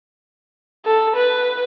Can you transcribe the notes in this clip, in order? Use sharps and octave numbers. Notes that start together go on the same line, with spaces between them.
A4
B4